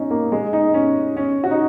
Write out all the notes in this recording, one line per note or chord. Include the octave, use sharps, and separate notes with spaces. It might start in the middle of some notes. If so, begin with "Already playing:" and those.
Already playing: C#4 D#4
A#3
G#3
D#4
C#4
C#4
F#4
D#4